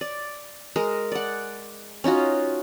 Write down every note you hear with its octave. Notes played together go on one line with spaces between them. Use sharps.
D5
G#3 A#4
D5 F#5
C#4 D#4 F4 F#4